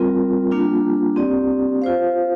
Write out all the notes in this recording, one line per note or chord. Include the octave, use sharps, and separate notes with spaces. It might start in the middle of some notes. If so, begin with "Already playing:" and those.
Already playing: G3 C4 F4 A#4
G3 A#3 D4 F4
C4 G4 D5
F4 C5 F5